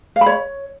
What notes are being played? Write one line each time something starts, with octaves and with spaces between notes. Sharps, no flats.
F5
B5
C#5